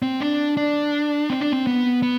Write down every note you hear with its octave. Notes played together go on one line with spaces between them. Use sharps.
C4
D4
D4
C4
D4
C4
B3
B3